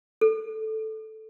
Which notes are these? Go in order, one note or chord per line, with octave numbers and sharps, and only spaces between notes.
A4